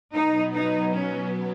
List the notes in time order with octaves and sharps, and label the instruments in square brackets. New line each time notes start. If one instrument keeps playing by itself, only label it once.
[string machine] B2 F#3 B3 [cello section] D#4
[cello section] D#4
C#4